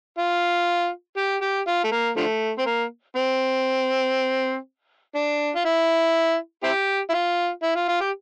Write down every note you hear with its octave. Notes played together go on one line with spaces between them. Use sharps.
F4
G4
G4
F4
A3
A#3
D3 F3 A3
C4
A#3
C4
D4
F4
E4
C4 E4 G4
E4
F4
E4
F4
F4
G4